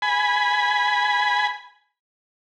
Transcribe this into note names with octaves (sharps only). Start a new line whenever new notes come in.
G#5 B5